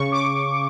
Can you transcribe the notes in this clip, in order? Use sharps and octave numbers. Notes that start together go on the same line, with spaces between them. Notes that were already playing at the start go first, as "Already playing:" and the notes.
Already playing: C#3 C#6
D6